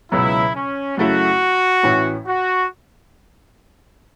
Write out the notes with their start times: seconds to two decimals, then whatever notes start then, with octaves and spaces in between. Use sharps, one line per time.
0.11 C#2 B2 F#3 E4
0.55 C#4
0.97 F#2 C#3 A3 E4 F#4 A4
1.83 A1 A2 E3 C#4 E4
2.27 F#4